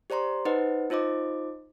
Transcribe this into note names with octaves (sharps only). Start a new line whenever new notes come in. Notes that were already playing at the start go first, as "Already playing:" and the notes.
G4 C5 D5 A#5 C6
D#4 B4 C5 D#5 F#5
D#4 F4 C5 D#5 D6